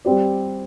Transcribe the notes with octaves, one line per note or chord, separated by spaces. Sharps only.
G3 C4 G4 D5